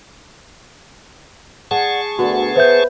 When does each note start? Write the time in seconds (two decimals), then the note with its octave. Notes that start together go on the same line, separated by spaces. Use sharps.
1.71 G#4 D5 F#5 A5 C#6
2.19 D2 B3 F#4
2.56 B4 C5 E5 G6